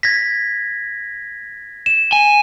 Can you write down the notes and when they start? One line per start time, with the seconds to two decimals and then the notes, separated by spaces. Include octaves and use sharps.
0.03 G#6 A#6 B6
1.86 E7
2.13 G#5